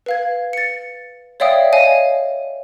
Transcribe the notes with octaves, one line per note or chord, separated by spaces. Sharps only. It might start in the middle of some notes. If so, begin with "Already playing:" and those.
B4 F5 G#6
A6 C#7
C#5 D5 E5 F5 G5 D#6
C#5 D#5 F5 G#5